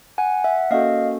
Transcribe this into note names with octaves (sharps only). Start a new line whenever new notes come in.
F#5 G#5
E5 F#5
A#3 C#4 F#4 A4 D#5 F5